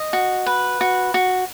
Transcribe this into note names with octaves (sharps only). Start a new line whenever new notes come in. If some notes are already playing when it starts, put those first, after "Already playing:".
Already playing: D#5
F#4
B4
F#4
F#4